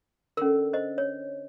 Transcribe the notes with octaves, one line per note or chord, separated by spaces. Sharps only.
D3 C#4 A#4
C5 D#5
C#5